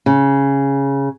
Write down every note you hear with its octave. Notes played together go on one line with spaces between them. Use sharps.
C#3